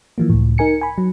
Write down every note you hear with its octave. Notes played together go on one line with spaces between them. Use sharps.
E3 F3 A#3
C#2 A2
D#4 A#4 G#5 C#7
G#5 B5
F#3